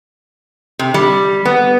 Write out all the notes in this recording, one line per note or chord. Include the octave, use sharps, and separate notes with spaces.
C3
G3
B3